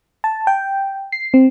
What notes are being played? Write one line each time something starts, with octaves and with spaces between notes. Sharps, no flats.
A5
G5
C7
C4